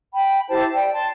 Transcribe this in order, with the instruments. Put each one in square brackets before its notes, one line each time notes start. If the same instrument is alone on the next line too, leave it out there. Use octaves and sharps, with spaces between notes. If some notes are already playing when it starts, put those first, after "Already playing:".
[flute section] G5 B5
E4 G4 C5 A5
D5 G5
A5 C6